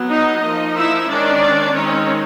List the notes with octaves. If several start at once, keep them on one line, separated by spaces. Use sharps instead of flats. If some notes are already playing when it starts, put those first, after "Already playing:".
Already playing: F#3 B3
D#4 D#5
F3 A#3 D#4
E4 E5
D#3 G#3 C#4 D4 D5
D#3 G#3 C4 C#4 D#4 C#5